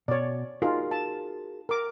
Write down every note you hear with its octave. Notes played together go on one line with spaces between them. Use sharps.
B2 C#5 D5
D#4 F4 F#4 G#4 A#4
A5
A#4 D6